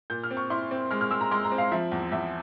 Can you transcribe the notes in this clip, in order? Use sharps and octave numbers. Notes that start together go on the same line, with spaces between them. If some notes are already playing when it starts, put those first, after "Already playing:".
A#2 G6
F6
C4
C#6
E4 C6
C4
G#3 F6
F6
G#3 E6
A#5
G#3 C6
A#5
C4
F5
F3 E5
E2
E2 E5